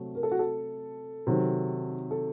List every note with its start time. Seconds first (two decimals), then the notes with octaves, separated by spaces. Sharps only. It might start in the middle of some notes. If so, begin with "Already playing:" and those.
Already playing: C3 F#3 A3 C4
0.15 A#4
0.23 A4
0.31 F#4
0.39 A4
1.27 C3 D#3 F#3
2.11 A4